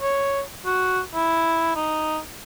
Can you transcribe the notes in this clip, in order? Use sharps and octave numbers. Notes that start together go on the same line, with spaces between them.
C#5
F#4
E4
D#4